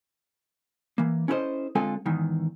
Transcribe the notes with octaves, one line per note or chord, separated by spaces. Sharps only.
E3 A#3
C#4 E4 A4 A#4 C5 D#5
D3 G#3 C4 F4 A4 G#5
E2 G#2 D#3 E3